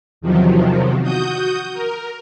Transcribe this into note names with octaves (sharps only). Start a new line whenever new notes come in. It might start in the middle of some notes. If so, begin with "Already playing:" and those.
E2 C3 D#3 F3 F#3
F#4 D#6 G6
A#4